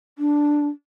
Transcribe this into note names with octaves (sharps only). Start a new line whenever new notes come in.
D4